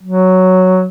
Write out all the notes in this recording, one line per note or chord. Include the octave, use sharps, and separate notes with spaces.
F#3